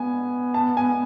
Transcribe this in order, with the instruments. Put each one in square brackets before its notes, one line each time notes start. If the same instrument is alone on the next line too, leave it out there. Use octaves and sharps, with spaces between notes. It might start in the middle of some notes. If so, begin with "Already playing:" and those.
Already playing: [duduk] B3 [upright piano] G#5
[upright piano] A5
G#5